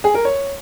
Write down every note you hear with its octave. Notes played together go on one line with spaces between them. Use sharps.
G#4
A#4
C#5